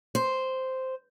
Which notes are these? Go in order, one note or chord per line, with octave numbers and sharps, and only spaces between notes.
C5